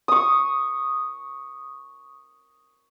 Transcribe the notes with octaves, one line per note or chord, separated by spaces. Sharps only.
C#6 D#6